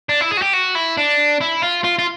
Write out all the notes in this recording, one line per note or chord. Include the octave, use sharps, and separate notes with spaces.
D4
E4
G#4
F#4
G4
F#4
E4
D4
E4
F4
F4
F4